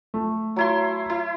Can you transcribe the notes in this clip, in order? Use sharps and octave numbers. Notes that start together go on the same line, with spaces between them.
A3
F#3 E4 C6
E4